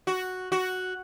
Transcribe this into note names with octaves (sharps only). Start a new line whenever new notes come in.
F#4
F#4